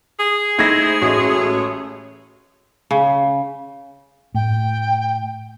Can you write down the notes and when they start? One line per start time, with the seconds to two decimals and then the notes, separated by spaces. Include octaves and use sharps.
0.19 G#4
0.59 A3 D#4 E4 C5 G#6 A#6
1.02 A1 G#3 A3 F#4 C#5 D#5
2.91 C#3
4.34 A2 G5